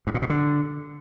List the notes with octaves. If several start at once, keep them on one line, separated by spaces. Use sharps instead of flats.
G2
A#2
B2
D3